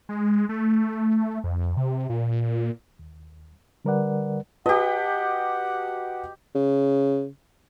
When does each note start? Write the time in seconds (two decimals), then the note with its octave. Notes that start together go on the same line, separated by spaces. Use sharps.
0.09 G#3
0.49 A3
1.44 F2
1.77 C3
2.09 A#2
2.99 D#2
3.85 D3 G3 A#4 B4 D5 F#5
4.66 F#4 G4 B4 D#5 F#5 A5
6.55 C#3